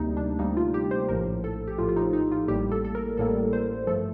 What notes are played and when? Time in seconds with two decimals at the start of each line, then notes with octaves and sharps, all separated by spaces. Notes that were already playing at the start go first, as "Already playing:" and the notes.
Already playing: D2 C3 G3 A#3 D#4
0.17 D4
0.39 D2 C3 G3 A#3 D#4
0.57 F4
0.74 G4
0.91 C5
1.09 A#1 A2 F3 A#4
1.44 A4
1.68 G4
1.78 A#1 A2 F3 F4
1.89 F4
1.96 D#4
2.13 D#4
2.32 F4
2.48 A1 A2 G3 A#3 G4
2.72 A4
2.85 A4
2.95 A#4
3.17 A1 A2 G3 A#3 A4
3.53 C5
3.87 G2 F3 A3 A4